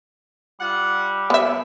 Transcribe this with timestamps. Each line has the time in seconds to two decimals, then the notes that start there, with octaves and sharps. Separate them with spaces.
0.61 G3 F4 F#5
1.30 C3 B3 E5